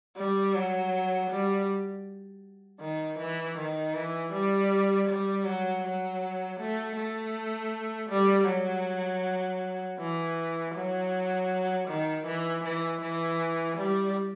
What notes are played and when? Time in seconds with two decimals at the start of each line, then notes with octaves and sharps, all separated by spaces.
0.17 G3
0.55 F#3
1.30 G3
2.80 D#3
3.19 E3
3.57 D#3
3.94 E3
4.32 G3
5.08 G3
5.45 F#3
5.84 F#3
6.59 A3
6.97 A3
8.10 G3
8.47 F#3
9.99 E3
10.74 F#3
11.88 D#3
12.26 E3
12.64 E3
13.01 E3
13.77 G3